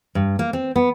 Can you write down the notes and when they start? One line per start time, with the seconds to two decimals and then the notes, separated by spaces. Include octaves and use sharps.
0.15 G2
0.39 A#3
0.53 C4
0.76 B3